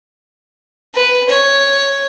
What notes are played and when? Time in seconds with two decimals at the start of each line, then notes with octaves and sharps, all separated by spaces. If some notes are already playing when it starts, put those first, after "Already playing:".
0.95 B4
1.29 C#5